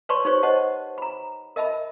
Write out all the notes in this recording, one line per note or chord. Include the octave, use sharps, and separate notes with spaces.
B4 C#5 D5 A5 C6 C#6
D#4 G4 C5 C#5 C#6
C5 C#5 D#5 F#5 A5
A#5 B5
A#4 D#5 E5 A5 B5